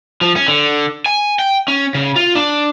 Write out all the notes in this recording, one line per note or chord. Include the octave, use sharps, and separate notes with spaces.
F3
C#4
D3
G#5
G5
C#4
C#3
F4
D4